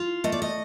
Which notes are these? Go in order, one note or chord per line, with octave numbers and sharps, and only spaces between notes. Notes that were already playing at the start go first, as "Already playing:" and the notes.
Already playing: F4
A3 D#5
D5
D#5